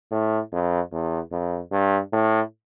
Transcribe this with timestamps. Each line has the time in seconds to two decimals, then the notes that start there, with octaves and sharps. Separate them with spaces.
0.11 A2
0.52 F2
0.92 E2
1.32 F2
1.72 G2
2.13 A2